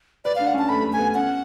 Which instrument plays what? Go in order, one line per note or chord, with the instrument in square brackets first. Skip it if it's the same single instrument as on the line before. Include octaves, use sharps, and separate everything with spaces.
[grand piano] B4 [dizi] D5
[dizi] F5
[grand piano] D4
[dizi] F#5
[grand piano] C#4 [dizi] A5
[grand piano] A3 [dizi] B5
[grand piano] A3
[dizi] G#5
[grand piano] B3
[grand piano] C#4 [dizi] F#5